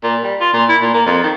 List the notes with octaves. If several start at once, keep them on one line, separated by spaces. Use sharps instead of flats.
A#2
G3
F4
A#2
E4
A#2
A#3
F2
D#3